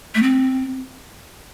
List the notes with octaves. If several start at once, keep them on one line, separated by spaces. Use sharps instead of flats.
A3
C4